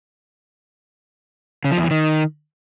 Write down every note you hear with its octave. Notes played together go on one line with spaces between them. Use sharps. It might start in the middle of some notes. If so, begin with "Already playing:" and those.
C#3
F3
E2
E3
D#3